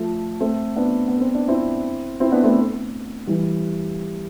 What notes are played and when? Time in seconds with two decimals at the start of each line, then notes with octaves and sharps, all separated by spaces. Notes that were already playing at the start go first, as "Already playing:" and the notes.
Already playing: F3 A3
0.40 A3 C4
0.76 B3 D4
1.08 B3
1.21 C4
1.35 D4
1.48 C4 E4
2.20 C4 E4
2.32 B3 D4
2.44 A3 C4
3.27 E3 G3